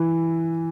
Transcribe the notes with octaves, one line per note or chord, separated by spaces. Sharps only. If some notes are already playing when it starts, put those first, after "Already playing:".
Already playing: E3